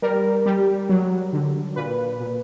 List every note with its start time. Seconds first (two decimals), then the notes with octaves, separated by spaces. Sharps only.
0.02 G3 A#4
0.46 G3
0.89 F#3
1.33 D3
1.76 A#2 B4
2.20 A#2